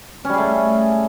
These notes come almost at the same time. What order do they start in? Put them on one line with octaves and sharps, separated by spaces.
C#4 G3 G#4 A3